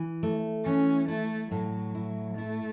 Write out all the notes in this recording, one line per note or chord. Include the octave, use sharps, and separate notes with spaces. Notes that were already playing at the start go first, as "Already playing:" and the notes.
Already playing: E3
A3
E3 C#4
A3 E4
A2 F#3
E4
A3 E4